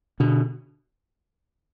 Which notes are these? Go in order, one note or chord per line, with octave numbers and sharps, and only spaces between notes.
B2 D3